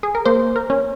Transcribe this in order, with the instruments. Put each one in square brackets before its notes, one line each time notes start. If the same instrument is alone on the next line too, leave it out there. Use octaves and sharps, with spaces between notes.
[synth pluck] G#4
A#4
A#3 C5
A#4
C#4